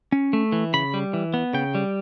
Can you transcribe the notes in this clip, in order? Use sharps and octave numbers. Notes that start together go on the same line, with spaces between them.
C#4
A3
E3
C#3 B5
G3
E3
B3
C#3 G5
G3